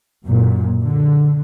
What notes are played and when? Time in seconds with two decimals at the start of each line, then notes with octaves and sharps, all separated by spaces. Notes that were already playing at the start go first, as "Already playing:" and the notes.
0.25 F#2 A#2
0.82 D3